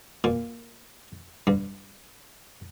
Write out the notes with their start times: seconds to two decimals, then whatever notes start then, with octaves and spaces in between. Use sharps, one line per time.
0.24 A#2
1.47 G2